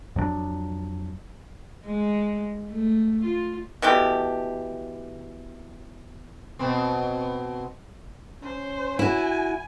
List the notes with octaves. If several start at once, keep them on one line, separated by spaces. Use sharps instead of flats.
F2 F#3 G#3 D4
G#3
A3
F4
B2 E3 A3 G4
B2 C4
C#4 C5
E4 F#4 G#5